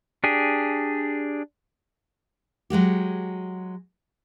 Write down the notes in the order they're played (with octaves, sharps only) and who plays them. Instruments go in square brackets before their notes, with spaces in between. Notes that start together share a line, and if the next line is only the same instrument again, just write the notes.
[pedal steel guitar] D4 G4 G#4
[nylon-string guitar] F#3 G#3 F#4 G4